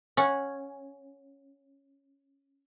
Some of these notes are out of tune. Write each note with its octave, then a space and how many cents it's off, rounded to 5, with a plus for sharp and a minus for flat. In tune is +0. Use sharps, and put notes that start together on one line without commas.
C#4 -5 F#5 -15